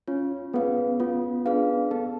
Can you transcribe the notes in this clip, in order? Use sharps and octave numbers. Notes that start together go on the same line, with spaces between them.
C#4 F4
B3 G#4 B4 F5
B3 F4
D4 G#4 B4 F5
B3 A4